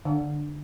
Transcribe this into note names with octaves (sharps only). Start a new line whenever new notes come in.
D3